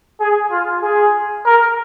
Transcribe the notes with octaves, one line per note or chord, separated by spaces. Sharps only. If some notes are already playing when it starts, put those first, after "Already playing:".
G#4
F4
G#4
A#4